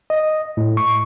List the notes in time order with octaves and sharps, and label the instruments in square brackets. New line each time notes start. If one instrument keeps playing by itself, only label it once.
[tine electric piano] D#5
A2
C#6